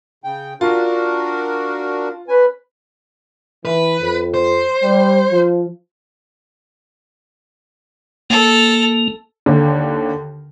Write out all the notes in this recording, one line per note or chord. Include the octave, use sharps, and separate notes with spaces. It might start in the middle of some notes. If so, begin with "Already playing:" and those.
C#3 G5
D4 F4 F#4 A#4
C#4 B4 G#5
E3 B4
F2
C5
G3
F3
A#3 A4
D#2 D3